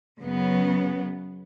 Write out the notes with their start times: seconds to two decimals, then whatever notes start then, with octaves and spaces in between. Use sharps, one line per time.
0.20 F#2 C#3 F#3 B3